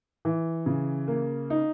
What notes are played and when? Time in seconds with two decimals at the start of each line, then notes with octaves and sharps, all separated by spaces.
0.25 E3
0.66 C#3
1.08 A#3
1.50 D#4